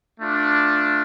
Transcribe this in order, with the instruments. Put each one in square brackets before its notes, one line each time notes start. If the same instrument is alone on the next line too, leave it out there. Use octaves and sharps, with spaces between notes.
[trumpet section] A3 D4 F4